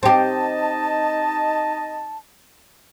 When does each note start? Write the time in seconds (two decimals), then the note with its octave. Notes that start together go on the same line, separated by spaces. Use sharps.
0.03 C4 D#4 G4 D#5 A5